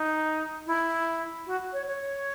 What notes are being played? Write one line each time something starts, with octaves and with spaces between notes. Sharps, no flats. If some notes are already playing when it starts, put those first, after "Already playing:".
Already playing: D#4
E4
F#4
C#5
C#5